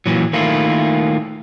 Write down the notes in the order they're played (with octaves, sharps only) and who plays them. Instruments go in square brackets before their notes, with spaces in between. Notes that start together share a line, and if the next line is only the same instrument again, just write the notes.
[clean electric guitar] A#2 E3 F#3
D#3 A3 A#3 E4 F4